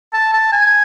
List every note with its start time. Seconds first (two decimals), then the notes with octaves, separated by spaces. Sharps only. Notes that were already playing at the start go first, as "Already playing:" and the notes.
0.14 A5
0.33 A5
0.53 G#5